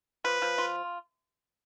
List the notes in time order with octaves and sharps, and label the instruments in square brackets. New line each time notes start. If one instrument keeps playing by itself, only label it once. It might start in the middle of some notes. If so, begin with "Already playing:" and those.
[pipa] F3 [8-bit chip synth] B4
[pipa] F3
F4